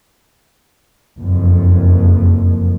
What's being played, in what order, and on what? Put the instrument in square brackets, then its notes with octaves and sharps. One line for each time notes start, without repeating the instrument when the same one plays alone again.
[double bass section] F#1 F2